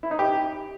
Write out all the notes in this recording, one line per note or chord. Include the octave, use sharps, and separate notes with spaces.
E4
D#4
G4